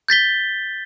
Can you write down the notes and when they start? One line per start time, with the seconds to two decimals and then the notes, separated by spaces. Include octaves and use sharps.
0.08 G6 A6 B6 G7